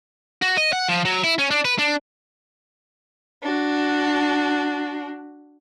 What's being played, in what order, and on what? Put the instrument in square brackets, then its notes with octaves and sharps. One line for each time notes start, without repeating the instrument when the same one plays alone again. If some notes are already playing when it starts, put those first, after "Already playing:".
[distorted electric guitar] F#4
D#5
F#5
F3
F#3
E4
C#4
D4
B4
D4
[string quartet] D4 F#4